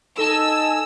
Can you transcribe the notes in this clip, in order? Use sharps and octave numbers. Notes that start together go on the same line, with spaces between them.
D#4 A4 D#5 G#5 A5 E6